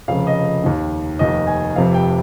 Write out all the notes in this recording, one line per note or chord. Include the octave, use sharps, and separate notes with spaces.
F1 F2 C#3 F5
D#5
D#2 D#3
F1 D#2 D#3 D#5
G#5
F1 F2 C3 F5
G5